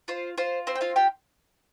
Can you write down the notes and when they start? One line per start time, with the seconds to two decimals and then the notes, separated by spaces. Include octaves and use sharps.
0.08 F4 C5
0.38 F4 C5
0.67 C4 C5
0.75 G5
0.81 F4 F5
0.96 F4 G4 G5